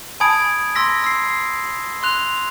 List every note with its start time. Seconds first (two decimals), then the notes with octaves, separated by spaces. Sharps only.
0.20 G#5 A5 B5 D#6 G#6 D7
0.75 C6 E6 A#6 B6
1.04 E6 C7
2.03 C6 F#6 F7